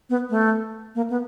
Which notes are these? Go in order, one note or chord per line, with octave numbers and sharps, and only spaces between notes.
B3
A3
A#3
B3